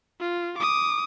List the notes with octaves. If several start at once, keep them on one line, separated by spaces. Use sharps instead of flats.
F4
D6 D#6